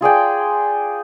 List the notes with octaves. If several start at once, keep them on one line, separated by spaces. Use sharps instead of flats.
F4 G#4 D5 G5